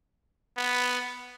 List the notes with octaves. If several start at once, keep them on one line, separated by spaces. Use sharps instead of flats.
B3